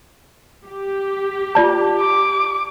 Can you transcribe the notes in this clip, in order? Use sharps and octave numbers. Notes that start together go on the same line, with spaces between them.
G4
F4 D5 A5
D6